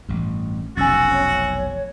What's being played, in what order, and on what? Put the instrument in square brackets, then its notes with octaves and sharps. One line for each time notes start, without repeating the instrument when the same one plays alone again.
[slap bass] A1 G2
[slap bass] F1 B1 [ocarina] C#4 [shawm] F#4 [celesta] G#5 E6 A6
[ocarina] C#5